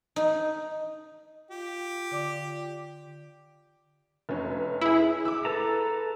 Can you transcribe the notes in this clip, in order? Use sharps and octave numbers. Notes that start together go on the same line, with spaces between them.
D#4
F4 G4
D3 D5 D6
F1 C#4
E4 G#4
D6 E6
A4 B4 A5 A#5